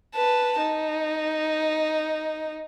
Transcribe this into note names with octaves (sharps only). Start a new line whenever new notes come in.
B4 A5
D#4